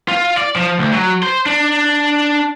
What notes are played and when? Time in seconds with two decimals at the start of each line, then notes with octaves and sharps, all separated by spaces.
0.08 F4
0.38 D5
0.56 F3
0.79 D2
0.93 F#3
1.23 C5
1.46 D4